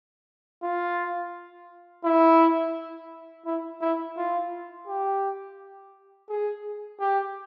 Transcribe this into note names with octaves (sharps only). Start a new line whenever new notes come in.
F4
E4
E4
E4
F4
G4
G#4
G4